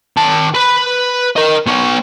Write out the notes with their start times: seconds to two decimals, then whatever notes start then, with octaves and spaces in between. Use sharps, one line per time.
0.17 D#3 A5
0.54 B4 B5
1.36 A#4 D#5
1.67 B3 C#5